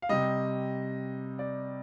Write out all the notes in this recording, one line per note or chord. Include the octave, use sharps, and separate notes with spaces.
F5
C3 G3 D#5
D5